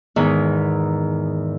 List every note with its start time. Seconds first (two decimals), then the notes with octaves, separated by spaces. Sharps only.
0.16 E2 G#2 D#3